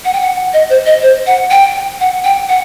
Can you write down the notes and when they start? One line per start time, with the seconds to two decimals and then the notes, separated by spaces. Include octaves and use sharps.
0.05 F#5
0.13 G5
0.21 F#5
0.53 D#5
0.70 C5
0.86 D#5
1.02 C5
1.27 F#5
1.51 G5
2.01 F#5
2.25 G5
2.49 F#5